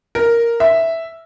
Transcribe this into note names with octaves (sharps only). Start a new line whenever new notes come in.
A#4
E5